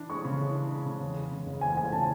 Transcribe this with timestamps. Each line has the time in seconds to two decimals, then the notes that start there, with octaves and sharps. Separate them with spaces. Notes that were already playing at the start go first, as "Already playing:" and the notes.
Already playing: E3 D4
0.10 G#3 C#6
0.25 C#3
0.40 E3
0.55 D4
0.71 G#3
0.86 C#3
1.01 E2
1.16 G#3
1.31 C#3
1.46 F#1
1.61 E2 G#5
1.77 G#3 G#5
1.92 C#3 A5